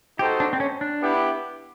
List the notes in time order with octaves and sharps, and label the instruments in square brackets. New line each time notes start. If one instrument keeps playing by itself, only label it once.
[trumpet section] D#4 F#4 A4 C5 [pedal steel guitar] G4
[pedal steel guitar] D4
C4
C#4
D4
[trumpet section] B3 E4 G4